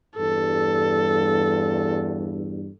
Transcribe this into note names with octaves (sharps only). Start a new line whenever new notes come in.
E2 G2 A4